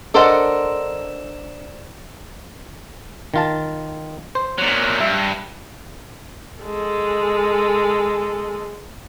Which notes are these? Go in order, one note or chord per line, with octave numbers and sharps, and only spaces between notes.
D4 A4 A#4 C5 D#5 F#5
D#3 F4 A5
C5
A#2 F#3
G2 E5
G#3 A4